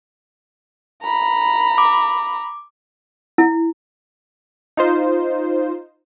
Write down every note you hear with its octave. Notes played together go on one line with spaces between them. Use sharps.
A#5 B5
D6
E4
D#4 F4 C5